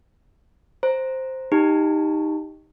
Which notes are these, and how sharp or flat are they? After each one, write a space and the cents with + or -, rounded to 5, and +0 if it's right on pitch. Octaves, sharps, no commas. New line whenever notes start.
C5 +0 A#5 +0
D#4 +0 G4 +10 A#5 -45